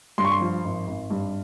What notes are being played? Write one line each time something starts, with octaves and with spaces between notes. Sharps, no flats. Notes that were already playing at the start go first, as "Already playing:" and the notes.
G2 C6
C#6
C6
F3
G#1
G#1
G2